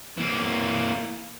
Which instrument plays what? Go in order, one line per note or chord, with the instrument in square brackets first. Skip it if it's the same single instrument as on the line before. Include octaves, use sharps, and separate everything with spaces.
[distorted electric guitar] E3 A#3